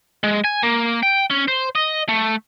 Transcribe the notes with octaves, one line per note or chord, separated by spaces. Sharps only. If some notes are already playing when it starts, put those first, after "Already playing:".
G#3
G#5
A#3
G5
C#4
C5
D#5
A3